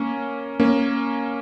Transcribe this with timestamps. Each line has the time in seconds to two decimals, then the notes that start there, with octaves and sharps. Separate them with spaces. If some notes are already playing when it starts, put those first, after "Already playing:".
Already playing: A#3 C#4
0.60 A#3 C#4